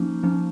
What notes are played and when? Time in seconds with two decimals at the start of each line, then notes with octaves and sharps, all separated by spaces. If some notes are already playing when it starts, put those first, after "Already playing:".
Already playing: F3 A#3 C#4 D#4
0.23 F3 A#3 C#4